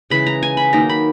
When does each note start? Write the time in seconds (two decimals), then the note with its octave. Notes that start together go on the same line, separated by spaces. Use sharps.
0.10 C#3 E3 G#3 B5
0.26 A#5
0.43 G#5
0.57 B5
0.73 D#3 F#3 A#3 D#4 A#5
0.89 B5